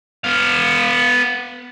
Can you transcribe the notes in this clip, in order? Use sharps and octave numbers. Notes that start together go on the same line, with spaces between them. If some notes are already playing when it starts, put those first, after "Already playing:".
B3 F5